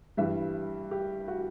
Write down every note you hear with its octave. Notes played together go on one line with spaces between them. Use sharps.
G2 E3 G3 E5
G4
F#4